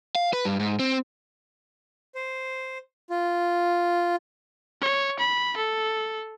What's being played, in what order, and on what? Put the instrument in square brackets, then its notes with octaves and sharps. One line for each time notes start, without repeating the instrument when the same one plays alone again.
[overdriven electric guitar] F5
B4
G2
G#2
C4
[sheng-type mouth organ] C5
F4
[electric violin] C#5
B5
A4